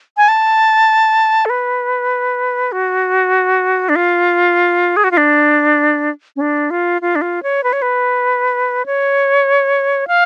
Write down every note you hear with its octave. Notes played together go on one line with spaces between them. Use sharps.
G#5
A5
A4
B4
F#4
D4
F4
G#4
F#4
F4
D4
C#4
D4
F4
F4
D4
F4
C#5
B4
C#5
B4
C#5
F5